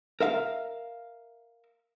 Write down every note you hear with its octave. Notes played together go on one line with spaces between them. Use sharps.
A#4 E5 F5